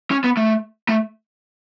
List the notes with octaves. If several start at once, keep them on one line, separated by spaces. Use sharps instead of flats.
C#4
B3
A3
A3